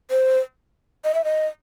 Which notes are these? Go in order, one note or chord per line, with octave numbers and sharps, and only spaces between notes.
C5
D#5
E5
D#5